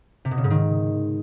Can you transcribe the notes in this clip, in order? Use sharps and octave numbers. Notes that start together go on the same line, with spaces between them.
C3
B2
C#3
G#2
D#3